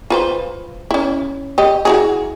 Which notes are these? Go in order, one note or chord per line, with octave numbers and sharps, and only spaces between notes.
F4 B4 C5
C#4 E4
G4 D#5
E4 F#4 G#4